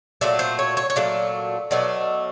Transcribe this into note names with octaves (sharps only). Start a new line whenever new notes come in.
A#2 F#3 A3 D5
C5
C#5
C#5
C#5
A#2 F#3 A3 D5
B2 F#3 A3 D5